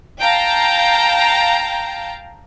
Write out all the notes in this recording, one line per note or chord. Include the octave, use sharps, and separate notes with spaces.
F5 G5 A5 A#5